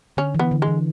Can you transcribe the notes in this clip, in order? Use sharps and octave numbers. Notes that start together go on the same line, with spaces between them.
D3 C#4
E3 B3
D3
G#3
E3